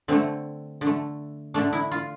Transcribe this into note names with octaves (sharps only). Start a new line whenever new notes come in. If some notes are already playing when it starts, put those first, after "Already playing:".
D3 A3 C4
D3
A3
D3 A3 D4
E4
F4